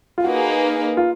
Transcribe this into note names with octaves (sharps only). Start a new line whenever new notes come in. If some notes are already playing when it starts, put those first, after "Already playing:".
F4
A#3 D#4 F#4 G#4 B4
F4